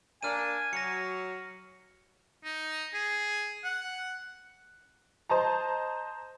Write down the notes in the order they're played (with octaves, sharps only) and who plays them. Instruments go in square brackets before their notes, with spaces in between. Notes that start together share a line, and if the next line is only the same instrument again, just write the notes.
[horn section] A#3 D4 [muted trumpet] G#5 [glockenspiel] F6 D#7
[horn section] F#3 [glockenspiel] A#6 C#7
[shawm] D#4
G#4
F#5
[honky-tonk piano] C5 D#5 A5 A#5